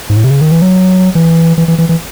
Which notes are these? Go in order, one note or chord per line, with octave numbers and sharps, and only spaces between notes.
G#2
A2
C3
C#3
D#3
E3
F#3
E3
E3
E3
E3
E3